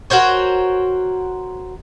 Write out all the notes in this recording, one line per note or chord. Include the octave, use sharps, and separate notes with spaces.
F#4 A#4 C5 C#5